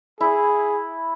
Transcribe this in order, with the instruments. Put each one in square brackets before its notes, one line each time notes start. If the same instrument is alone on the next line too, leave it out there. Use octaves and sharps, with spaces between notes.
[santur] E4 [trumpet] G#4